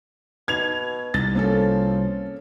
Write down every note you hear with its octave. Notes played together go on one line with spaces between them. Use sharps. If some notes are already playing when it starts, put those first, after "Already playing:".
B2 G#6 F7
C2 A6
F3 A#3 C#4 A4